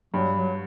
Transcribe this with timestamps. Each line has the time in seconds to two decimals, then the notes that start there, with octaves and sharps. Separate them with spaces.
0.14 G2 F#3
0.37 F#3